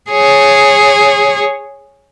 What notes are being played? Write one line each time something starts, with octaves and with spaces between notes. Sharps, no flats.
G#4 C#5